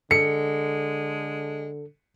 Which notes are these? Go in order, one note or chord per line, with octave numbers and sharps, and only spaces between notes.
D3 G#3 A4 C#7